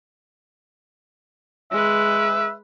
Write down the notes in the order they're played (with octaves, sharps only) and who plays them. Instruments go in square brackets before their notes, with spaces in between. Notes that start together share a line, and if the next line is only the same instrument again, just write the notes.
[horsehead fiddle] G#3 B4 [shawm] E5